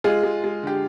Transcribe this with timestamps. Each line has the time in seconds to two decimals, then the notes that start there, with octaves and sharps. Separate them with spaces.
0.04 G#3 F4 G#4
0.23 G#3
0.44 G#3
0.63 D3 G4